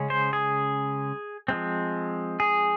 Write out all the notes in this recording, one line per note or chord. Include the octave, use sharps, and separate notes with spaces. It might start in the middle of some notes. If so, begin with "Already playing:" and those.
Already playing: C#3 G#3 C#4
C5
G#4
F3 G#3 C4
G#4